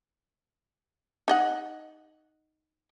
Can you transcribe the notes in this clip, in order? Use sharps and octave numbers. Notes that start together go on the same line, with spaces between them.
D#4 D#5 F#5